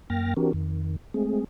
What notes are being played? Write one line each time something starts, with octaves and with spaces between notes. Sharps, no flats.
F#2 A#3 G5 F6 A6 A#6
E3 C4 D4 F#4 G4 A#4
F2 D#3
G#3 A3 C4 G#4